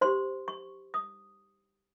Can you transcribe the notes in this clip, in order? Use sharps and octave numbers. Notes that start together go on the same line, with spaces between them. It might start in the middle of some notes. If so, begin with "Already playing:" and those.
G4 C5 C6
C#6
D#6